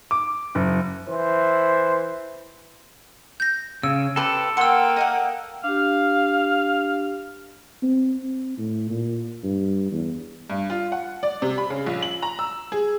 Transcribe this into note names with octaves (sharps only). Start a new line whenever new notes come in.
D6
F#1
E3 C5
G6 A#6
C#3 E6
G4 A4 B4 C5
A#3 F#5 G5 C6 E6 C#7
D#5 F5 F#5
D4 G4 F5
C4
C4
A2
A#2
G2
E2
G2
F4
F#5
D5
C3
B5
C#3
A#1
F#7
A#5
E6
G#4